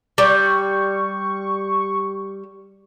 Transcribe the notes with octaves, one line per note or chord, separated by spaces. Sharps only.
G3 C#6